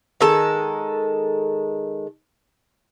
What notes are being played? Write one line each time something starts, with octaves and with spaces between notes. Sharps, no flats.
D#3 G#3 A4